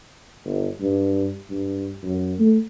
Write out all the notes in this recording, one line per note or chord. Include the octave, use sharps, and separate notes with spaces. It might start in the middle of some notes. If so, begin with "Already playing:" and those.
G1
G2
G2
F#2
A3